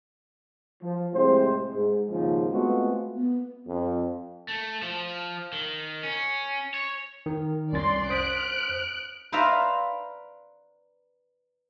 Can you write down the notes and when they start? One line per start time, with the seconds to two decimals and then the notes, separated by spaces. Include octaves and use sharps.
0.83 F3
1.13 A2 C3 G#3 G4 C5
1.74 G#2
2.11 D#2 G#2 C#3 F3
2.52 G#3 A3 B3 C4 F4 F#4
3.15 B3
3.67 F2
4.48 A3
4.82 F3
5.53 D#3
6.03 C#4
6.74 C#5
7.26 D#3
7.73 C2 C#4 D5 C6 A6
8.10 C5 D#6 F#6 B6 D7
9.32 B4 C5 D5 E5 F5 A#5